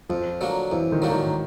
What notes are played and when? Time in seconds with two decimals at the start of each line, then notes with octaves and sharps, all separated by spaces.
0.09 F2 F3
0.41 D3 F#3 A#3 D4
0.71 F2 E3
0.92 D#3
1.02 D3 F#3 A#3 D4
1.11 D#3